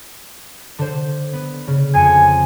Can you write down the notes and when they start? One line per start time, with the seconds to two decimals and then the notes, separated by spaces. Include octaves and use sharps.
0.78 D3 C5
1.33 B3
1.67 C#3
1.94 F2 G#5 C#7